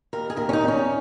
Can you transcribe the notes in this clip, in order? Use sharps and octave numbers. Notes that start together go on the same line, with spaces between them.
D#2 A#4
G#4
D#2 A#4
C#4
D#4
D#2
C#4